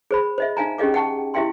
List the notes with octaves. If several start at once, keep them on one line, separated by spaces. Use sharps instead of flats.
G#4 C5 B5
C5 D#5 E5
D#4 F5 G#5 A#5
C#4 G4 G#4 D#5 F5 D6
F#5 G5 A5 C#6
E4 G4 E5 F5 G5 C6